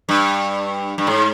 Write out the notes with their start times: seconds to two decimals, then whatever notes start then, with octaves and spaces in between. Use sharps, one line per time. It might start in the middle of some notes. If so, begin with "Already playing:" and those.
0.09 G2
0.98 G2
1.07 G#2